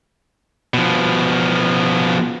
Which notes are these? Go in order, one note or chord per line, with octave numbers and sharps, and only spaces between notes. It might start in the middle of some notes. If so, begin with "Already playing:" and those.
B2 F3